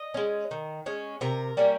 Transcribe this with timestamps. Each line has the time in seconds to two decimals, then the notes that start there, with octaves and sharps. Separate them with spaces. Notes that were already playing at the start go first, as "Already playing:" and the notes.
Already playing: D#5
0.14 G#3 C#4
0.51 D#3
0.86 G#3 C#4
1.21 C3 A#4
1.57 G3 A#3 C#4